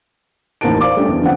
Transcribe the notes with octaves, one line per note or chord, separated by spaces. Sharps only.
A1 D#2 A#4 C5 A5 D7
C5 D5 F5 D6
G3 A3 C#4 D4
E2
D3 F3 B3 C4 F#5